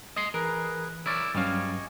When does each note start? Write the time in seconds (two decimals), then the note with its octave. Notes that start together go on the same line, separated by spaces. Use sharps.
0.16 D#5 C6
0.34 E3 G#4 A#4 B4
1.06 E4 A#4 C#5 D5
1.35 G2 F#3 G3 C#4 D#5 F5 G#5 C#6